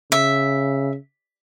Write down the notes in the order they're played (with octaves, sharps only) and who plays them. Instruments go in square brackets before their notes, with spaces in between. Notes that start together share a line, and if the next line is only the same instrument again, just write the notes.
[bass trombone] C#3 [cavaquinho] E5